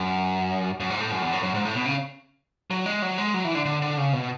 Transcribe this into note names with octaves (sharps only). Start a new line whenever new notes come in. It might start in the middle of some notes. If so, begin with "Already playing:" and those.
Already playing: F#2
F#2
G#2
A2
F#2
E2
F#2
F#2
G#2
A2
B2
C#3
F#3
G#3
F#3
G#3
F#3
E3
D3
D3
D3
C#3
B2